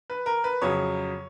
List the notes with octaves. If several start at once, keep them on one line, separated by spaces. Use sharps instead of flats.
B4
A#4
B4
F2 C#3 F#3 C#5